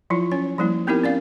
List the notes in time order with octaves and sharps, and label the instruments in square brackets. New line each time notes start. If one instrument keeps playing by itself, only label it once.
[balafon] F3 F#3 E4 F4
C#4 C#5
F3 G3 A#3 E4
B3 C4 D#4 E4 G4 A#4
C#4 D5 F5